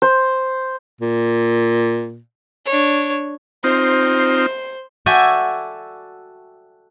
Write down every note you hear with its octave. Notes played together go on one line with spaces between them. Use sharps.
C5
A#2
D4 C#5
C4 D#4 F4 C5
F#4 A4 D5 E5 G5 G#5